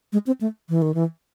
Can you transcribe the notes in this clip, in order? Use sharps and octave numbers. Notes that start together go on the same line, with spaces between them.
G#3
C4
A3
E3
D#3
E3